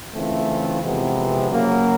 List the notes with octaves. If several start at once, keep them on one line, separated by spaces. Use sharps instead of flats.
C#3 E3 A3 C4 F4
F2 C3 E3 G#3 B3
C#3 F#3 A#3